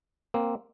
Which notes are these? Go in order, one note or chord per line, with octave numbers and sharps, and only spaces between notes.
A#3 C4